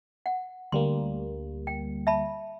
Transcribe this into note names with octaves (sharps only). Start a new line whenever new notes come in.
F#5
D2 G3 A#3 C6
G5
E5 A5 B5